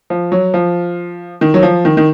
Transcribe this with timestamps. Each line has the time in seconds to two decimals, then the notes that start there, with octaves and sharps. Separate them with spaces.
0.10 F3
0.32 F#3
0.54 F3
1.41 D#3
1.54 F#3
1.63 F3
1.85 D#3
1.97 D#3